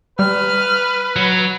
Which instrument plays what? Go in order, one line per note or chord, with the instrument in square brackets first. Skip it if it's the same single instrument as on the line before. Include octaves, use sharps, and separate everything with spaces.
[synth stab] G3 [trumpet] B4 [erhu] F6
[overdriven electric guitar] F#3